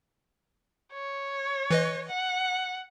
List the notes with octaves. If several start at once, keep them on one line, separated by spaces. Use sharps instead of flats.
C#5
E3 B4 D#5
F#5